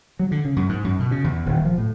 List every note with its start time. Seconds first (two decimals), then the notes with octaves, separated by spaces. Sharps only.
0.19 F#3
0.31 D3
0.45 C#3
0.56 F#2
0.69 G#2
0.84 F#2
1.00 B2
1.11 C#3
1.24 E2
1.46 D#1
1.65 F3
1.78 A2